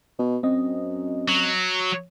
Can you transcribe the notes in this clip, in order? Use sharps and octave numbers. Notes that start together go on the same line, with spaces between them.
B2
F#2 C4 D#5
F#3